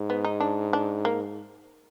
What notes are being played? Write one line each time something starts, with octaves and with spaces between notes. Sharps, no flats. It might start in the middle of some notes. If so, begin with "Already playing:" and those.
Already playing: G#2
B3
D#4
D4
D4
A#3